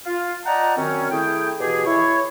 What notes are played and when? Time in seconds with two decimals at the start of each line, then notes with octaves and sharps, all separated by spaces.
0.06 F4
0.45 D5 D#5 F#5 G5 A5 A#5
0.77 F#2 D#3 C4 C#4
1.10 A3 E4 G#4 G5
1.60 B2 E3 G4 G#4
1.86 E4 C#5